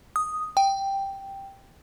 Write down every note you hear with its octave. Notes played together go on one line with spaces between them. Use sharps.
D#6
G5